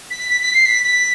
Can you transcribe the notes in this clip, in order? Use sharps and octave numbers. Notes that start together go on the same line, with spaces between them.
B6
B6
B6
C7
B6
B6